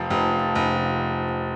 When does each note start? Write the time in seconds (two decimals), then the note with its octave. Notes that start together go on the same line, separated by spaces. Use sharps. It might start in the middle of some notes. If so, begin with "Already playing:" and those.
Already playing: F1 F3
0.10 F1
0.55 F1